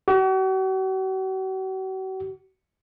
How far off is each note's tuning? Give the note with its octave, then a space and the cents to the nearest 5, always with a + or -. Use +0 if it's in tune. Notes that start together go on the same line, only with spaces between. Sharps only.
F#4 +40